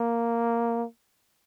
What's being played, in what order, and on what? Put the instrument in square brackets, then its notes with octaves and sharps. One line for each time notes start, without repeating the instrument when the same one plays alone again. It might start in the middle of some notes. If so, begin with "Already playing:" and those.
Already playing: [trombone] A#3